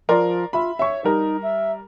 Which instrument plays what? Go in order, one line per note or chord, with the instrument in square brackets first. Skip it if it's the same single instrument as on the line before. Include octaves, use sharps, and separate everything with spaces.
[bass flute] F3 [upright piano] A#4 D5 C6
[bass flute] F4 [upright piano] E5 B5
[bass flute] C#5 [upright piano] E5 C#6
[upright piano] G3 A#4 [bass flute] D#4
[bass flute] E5